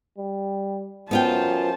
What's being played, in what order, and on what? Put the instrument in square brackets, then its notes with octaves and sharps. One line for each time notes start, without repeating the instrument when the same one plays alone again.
[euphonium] G3
[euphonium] F#2 [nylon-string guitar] B3 F4 G5 [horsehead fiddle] C5 A5